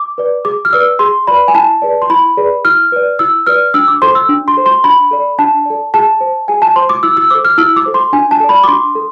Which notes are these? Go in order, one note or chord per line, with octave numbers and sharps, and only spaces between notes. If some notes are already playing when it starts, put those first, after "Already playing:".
Already playing: D6
B4 D5
G#4 D6
F6
B4 D5 E6
G#4 C6
B4 D5 B5
G#5
E4 A5
G#4 B4 D5
C6
E4 B5
G#4 B4 D5
E4 F6
B4 D5
E4 E6
B4 D5 F6
D4 E6
D6
A4 C5 C6
E6
D4
C6
A4 C5
C6
D4 B5
A4 D5
D4 A5
A4 D5
G#4 A5
C5
G#4 G#5
A5
C5 C6
D6
E4 E6
E6
A4 C5 D6
F6
E4 E6
D6
A4 C5
C6
D4 G#5
A5
A4 D5
B5
D6
D4 C6
A4